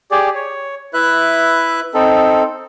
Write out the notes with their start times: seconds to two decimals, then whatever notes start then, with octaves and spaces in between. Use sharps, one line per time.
0.11 G4 G#4 D5
0.35 C#5
0.94 E4 B4 E5 F#6
1.94 C4 D#4 A4